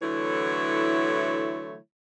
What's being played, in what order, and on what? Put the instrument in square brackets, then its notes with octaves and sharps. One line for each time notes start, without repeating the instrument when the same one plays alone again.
[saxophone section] D3 E3 F#3 A3 E4 C#5